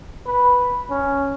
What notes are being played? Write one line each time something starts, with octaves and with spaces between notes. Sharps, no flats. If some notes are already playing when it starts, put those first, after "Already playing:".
B4
C#4